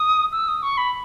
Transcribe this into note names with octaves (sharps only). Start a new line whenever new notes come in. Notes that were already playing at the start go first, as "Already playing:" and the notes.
Already playing: D#6
E6
D#6
C#6
B5